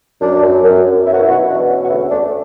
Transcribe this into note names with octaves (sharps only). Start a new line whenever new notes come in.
F#2 D4
F#2
F#2
F#2
B2 E4
F#4
E4
B2 F#4
E4
E2 D4 F#4
C#4
F#4
D2 E4
A3 D4